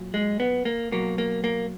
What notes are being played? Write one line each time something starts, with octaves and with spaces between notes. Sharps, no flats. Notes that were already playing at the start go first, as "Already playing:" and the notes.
Already playing: A#2 F#3
G#3
B3
A#3
B2 F#3 A#3
A#3
A#3